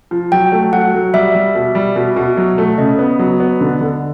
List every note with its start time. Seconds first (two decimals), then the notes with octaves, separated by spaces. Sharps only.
0.11 F3
0.32 F#3 G5
0.52 A3
0.73 F#3 F#5
0.94 F#3
1.14 G3 E5
1.35 G3
1.55 B2
1.75 G3
1.96 B2
2.16 B2
2.37 F#3
2.58 A3
2.78 C#3 D#5
2.99 B3
3.19 F#3
3.40 B3
3.61 D3
3.81 D3